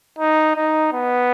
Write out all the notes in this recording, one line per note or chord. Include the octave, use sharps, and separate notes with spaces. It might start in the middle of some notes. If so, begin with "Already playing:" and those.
D#4
D#4
B3